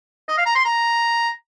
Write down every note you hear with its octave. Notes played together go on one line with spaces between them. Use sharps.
D#5
F5
A#5
C6
A#5